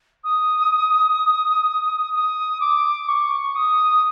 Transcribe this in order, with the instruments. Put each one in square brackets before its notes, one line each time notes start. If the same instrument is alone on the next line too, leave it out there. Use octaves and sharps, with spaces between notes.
[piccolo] D#6
D#6
D6
C#6
D#6